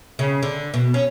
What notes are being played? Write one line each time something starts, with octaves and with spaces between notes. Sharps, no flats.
C#3
D3
B2
C#4